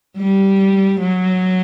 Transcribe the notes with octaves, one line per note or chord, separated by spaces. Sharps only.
G3
F#3